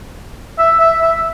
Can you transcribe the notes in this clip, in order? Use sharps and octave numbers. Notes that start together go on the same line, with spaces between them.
E5
E5
E5